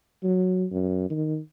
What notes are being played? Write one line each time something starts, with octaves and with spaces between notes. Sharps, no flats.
F#3
F#2
D#3